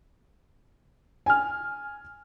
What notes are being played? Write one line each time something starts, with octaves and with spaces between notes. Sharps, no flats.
G#5 F6